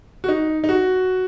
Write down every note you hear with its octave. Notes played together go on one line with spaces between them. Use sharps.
F#4
D#4
D#4
F#4